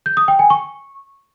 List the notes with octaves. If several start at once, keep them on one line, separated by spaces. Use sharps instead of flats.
G6
D#6
G5
G#5
C#6